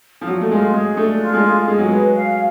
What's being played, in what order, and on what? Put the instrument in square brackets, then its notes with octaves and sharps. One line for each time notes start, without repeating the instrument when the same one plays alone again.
[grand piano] F3
[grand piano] F#3 [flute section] D4
[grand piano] A3
[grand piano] G#3 [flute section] F4
[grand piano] G#3 [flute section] G#4
[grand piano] A3 [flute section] D4
[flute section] F4
[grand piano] G#3
[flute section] G#4
[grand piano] G#3 [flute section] G#4
[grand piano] F#3
[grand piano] G#3 [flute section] B4
[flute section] F5